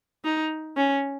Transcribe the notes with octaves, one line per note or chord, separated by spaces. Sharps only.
D#4
C#4